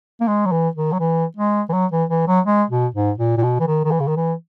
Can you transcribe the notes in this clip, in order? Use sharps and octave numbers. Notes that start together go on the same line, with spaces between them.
A#3
G#3
F#3
E3
D#3
F#3
E3
G#3
E3
F#3
E3
E3
F#3
G#3
B2
G#2
A#2
A#2
B2
E3
D#3
D#3
E3
C#3
D#3
E3